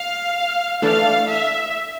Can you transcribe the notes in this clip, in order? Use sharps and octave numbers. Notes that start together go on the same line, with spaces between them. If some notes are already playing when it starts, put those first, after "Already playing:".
Already playing: F5
E3 A3 D4 A4 F5
E5